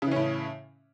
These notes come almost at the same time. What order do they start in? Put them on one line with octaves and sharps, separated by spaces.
C#3 E3 C#4 A2